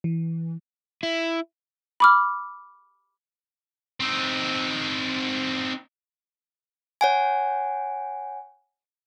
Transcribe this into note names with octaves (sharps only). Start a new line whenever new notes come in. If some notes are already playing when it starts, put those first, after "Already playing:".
E3
E4
B5 D6 F6
C4 D#4
C#5 F#5 G#5